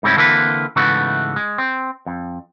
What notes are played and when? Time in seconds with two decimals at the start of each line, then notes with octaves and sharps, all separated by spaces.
0.03 G#2 C#3 G3 C4 C#4 E4
0.16 D3 E3 A#3 C4 E4 B4
0.76 G#2 C#3 E3 A3 B3 F#4
1.36 G#3
1.58 C4
2.06 F2